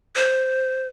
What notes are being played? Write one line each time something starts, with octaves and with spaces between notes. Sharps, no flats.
C5